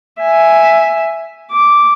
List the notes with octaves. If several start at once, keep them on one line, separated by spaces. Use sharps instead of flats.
E5 G#5
D6